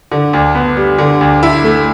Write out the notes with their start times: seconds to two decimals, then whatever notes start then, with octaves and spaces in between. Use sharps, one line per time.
0.12 D3
0.33 D2
0.55 B3
0.77 G3
0.98 D3
1.21 D2
1.43 E4
1.64 A3